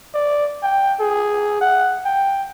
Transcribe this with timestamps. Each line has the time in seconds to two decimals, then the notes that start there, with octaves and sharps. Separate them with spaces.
0.14 D5
0.63 G5
1.00 G#4
1.61 F#5
2.05 G5